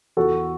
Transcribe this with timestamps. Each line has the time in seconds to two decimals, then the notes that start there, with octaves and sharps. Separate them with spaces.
0.17 E2 F#4 A4